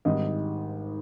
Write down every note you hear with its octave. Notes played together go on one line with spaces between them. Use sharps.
G#1 G#2 G3 D#5